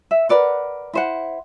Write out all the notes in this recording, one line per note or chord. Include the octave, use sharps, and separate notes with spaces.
E5
A#4 B4 D5 F#5
E4 C5 F#5